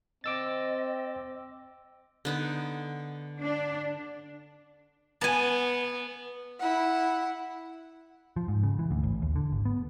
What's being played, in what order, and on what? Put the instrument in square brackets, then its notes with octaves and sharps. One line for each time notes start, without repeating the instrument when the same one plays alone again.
[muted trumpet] C4 [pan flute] D#5 [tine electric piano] D6 E6 A6
[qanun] D3 B3 D#4
[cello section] D4
[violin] B3 [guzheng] G#5 A5
[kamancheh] E4 F#5
[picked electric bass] F3
G#2
C#3
E3
D2
A1
D#2
D3
G#1
B3